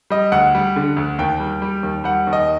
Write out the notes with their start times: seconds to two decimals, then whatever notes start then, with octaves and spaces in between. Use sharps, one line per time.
0.10 G3 D#5
0.32 D2 F#5
0.55 G3
0.76 D3
0.96 D2
1.18 D#2 G5
1.40 G3
1.62 G3
1.83 D#2
2.04 G3 F#5
2.27 D#2
2.33 D#5